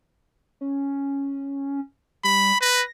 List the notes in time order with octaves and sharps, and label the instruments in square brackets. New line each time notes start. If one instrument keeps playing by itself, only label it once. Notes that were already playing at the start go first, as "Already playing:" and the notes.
[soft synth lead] C#4
[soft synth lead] G3 [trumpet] B5
[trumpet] B4 [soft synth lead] A#6